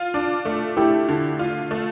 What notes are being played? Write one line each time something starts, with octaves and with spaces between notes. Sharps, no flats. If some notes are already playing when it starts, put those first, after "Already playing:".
Already playing: F4
D4
A3
A3 E4 G4
D3
F4
A3